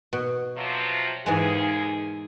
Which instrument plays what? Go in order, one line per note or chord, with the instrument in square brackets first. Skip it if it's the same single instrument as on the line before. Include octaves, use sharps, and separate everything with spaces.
[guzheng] B2
[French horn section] C3 F3 F#3
[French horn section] D#2 G#4 [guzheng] G#2 E3 G#3